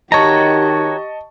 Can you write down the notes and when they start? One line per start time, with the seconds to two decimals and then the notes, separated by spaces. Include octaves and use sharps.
0.12 D#3 F#4 G4 C#5 D#5 A5 A#5 C#6